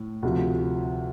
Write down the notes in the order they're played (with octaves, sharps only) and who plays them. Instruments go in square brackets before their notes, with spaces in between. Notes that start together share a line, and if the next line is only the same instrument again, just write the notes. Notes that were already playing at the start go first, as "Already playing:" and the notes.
Already playing: [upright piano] A2
D2 C3 F3